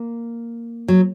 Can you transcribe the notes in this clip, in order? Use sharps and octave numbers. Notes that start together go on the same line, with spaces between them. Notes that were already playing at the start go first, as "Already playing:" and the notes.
Already playing: A#3
F#3